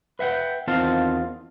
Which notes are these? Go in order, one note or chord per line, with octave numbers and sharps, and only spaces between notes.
B4 E5 F#5 G5
E2 D#3 C4 F4 F5 A5